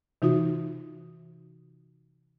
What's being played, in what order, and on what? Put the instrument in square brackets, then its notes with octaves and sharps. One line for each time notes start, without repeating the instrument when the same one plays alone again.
[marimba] C3 E3 D#4 F4 F#4 D#6